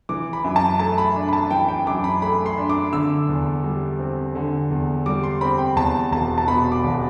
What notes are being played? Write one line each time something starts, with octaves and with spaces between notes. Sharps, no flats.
E3 D6
B5
F#2
A5
A3 A5
B5
D4
B5
A5
E3 G5
G5
F#2 D6
B5
A3 B5
C6
D4
D6
D3 E6
E2
G3
C4
D3
E2
G3 D6
C6
C4 B5
G5
E2 A5
E1 A5
A5
B2 B5
D6
E1